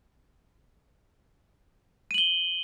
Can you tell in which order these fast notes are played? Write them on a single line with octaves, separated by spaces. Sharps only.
D#7 F#7 G7